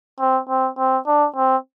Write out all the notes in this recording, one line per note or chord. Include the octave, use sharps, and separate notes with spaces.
C4
C4
C4
D4
C4